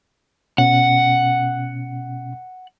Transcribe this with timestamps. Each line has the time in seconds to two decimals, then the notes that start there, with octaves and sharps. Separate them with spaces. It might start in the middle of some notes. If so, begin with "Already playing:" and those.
0.58 B2 C#4 F#5